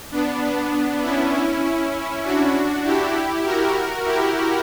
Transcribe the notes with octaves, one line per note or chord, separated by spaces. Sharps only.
B3 D4
B3 D4
C#4 E4
C#4 E4
D4 F#4
E4 G4
F#4 A#4
E4 G4